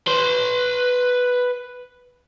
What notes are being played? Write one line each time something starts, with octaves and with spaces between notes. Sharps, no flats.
B4 C6